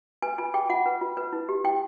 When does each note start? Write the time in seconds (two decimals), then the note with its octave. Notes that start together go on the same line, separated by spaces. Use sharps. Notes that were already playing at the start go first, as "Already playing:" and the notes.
0.22 B4 G#5
0.38 F4 G#5
0.54 G#4 G5
0.69 F4 F#5
0.86 B4
1.01 F4
1.17 B4
1.33 E4
1.49 G4
1.64 E4 G5